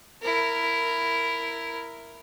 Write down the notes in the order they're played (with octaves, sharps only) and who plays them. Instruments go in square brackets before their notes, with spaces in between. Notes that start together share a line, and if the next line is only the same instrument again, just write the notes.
[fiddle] E4 A#4